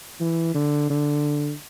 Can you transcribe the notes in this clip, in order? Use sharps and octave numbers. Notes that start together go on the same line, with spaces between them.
E3
D3
D3